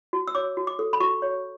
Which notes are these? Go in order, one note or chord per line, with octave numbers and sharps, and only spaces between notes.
F#4
E6
C#5 D6
F#4
D6
A4
B5
F#4 C#6
C#5